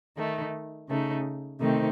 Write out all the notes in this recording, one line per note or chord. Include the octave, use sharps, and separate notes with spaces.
D#3 A3 D#4
C#3 A3 D#4
C3 D#3 A3 C4 D#4